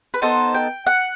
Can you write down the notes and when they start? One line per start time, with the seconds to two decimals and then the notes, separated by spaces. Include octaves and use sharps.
0.14 B4
0.22 B3 D#4 A4 C5
0.54 G5
0.87 F#5